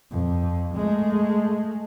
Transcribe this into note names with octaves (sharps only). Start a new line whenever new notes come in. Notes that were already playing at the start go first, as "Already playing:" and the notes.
F2
G#3 A3